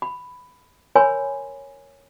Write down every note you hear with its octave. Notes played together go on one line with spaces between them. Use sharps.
B5
A#4 C#5 G#5 B5 C6